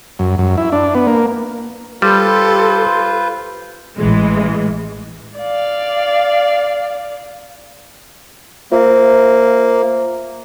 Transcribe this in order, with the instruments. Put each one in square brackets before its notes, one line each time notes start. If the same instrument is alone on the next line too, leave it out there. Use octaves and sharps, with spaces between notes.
[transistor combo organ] F#2
F#2
E4
D4
B3
A#3
[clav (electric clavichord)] G3 [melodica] F4 B4 C5 [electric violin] G4 A4
[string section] A1 E3 G#3
[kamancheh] D5 F5
[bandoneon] A#3 [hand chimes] F4 C5 E5